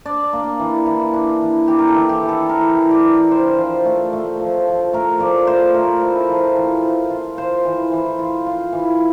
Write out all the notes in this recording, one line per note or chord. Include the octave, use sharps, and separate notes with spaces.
D4 D5
A#3
E3
E3
D4
E3
E3 G4
A#4
A4
E3
G4
E3
A4
E3 A#4
E3
D5
D4
E4 C5
F3
A3
A3
F3
F3
A3 A#4
F3 D5
A3 C5
A3 A#4
E4
F3
E3
F4
F4
F4 C5
E3
E3
F4
F4
E3